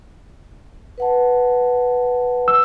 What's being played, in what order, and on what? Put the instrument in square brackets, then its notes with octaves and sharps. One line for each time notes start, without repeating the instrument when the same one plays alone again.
[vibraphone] B4 F#5 A5
[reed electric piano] E6